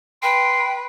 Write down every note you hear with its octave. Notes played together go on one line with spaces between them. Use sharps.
B4 G5 C6